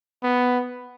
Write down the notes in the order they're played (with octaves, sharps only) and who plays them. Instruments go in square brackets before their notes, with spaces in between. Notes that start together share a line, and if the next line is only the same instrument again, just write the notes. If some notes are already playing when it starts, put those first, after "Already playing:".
[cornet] B3